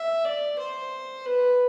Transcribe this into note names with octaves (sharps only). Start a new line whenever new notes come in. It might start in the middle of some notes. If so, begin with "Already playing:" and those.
Already playing: E5
D5
C5
B4